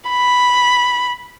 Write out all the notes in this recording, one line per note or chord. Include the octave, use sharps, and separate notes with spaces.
B5